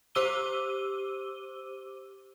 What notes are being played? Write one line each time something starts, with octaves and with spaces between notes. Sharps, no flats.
G4 C5 D6 E6 D#7 G7